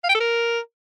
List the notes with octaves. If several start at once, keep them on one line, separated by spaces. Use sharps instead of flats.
F5
G5
A4
A#4